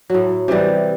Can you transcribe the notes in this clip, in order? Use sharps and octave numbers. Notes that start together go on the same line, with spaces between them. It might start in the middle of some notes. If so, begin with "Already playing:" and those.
A2 F#3
C3 E3 G3